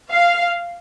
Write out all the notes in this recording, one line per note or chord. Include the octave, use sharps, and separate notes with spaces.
F5